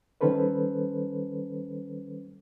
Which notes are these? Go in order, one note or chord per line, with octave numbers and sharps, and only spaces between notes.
D#3 G3 C#4 A4 B4 C5